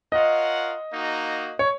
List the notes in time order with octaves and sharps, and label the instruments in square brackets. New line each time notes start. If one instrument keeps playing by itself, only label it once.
[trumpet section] F4 A#4 C#5 F#5 [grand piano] D#5
[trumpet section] A#3 D#4 F#4
[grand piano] C#5